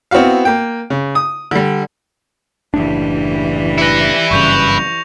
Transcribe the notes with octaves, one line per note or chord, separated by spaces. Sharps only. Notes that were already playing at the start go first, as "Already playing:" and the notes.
B3 C4 E4 F#4 F5
A#3 G5
C#3
D#6
D3 G3
F#1 A2 E3 G3 D4
E4 B4 A#6 C#7
F#1 G2 C#3 C#6 G6 F7